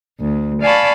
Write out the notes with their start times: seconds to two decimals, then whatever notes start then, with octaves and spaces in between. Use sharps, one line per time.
0.21 D2
0.61 D5 F5 G#5 A5 B5 C#6